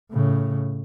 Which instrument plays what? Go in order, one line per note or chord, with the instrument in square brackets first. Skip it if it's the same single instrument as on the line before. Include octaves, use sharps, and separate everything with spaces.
[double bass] A2 C#3